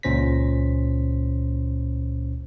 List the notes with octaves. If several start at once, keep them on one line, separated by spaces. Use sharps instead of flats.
C#2 A#2 C#4 C5 A#6 B6